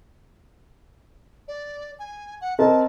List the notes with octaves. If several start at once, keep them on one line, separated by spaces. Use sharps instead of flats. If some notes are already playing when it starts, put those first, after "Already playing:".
D5
G#5
F#5
C4 A#4 D#5 A5